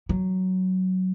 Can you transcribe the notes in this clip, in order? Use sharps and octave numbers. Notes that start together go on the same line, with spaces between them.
F#3